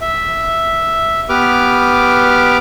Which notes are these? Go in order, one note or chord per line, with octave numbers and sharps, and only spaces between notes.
E5
B3 G4 B4 D6 F6